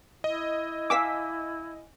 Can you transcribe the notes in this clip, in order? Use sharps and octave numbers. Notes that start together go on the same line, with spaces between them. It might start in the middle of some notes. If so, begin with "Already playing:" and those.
E4 D#5
F5 G#5 A5 D6 E6 B6